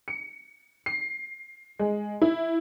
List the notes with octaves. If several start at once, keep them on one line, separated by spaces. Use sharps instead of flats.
C#7
C7
G#3
E4